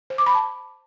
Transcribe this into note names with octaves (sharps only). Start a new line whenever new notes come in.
C5
D6
B5
A5